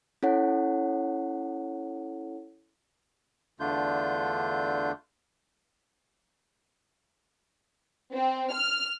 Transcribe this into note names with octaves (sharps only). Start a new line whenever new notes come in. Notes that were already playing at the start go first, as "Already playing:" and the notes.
C#4 E4 A4 C#5 F#5
E2 D3 A3 D4 F4 G6
C4
F6